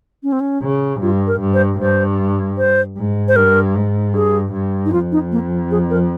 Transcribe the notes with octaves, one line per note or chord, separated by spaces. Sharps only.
C#4
C4
C#4
C#3
G2 F4
A#4
G2
C5
G2 C5
C5
G#2
C5
G2 A#4
G#2
G2 G#4
G2
D#4
F2 F4
D#4
A#3
G#4
A#4